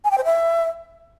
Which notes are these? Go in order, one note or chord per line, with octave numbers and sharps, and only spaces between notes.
G#5
G5
C5
E5